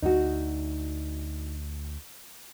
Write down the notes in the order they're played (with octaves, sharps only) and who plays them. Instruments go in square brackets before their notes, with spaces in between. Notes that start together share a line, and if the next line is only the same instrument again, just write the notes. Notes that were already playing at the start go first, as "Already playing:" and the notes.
[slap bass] D2 [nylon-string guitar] D#4 F#4